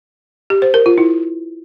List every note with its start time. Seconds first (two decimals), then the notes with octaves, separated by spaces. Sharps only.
0.50 G4
0.62 C5
0.74 A#4
0.86 F4
0.98 E4